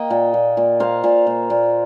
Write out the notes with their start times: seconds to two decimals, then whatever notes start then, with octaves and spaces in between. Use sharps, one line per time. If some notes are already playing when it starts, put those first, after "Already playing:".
Already playing: A#3 D#5 G5
0.10 A#2
0.34 A#2
0.57 A#2
0.80 A#3 C5 F5
1.04 A#2
1.27 A#2
1.50 A#2